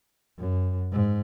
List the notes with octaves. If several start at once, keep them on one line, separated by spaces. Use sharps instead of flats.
F#2
G#2